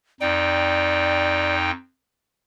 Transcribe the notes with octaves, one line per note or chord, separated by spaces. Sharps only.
F2 D#4 D5 G5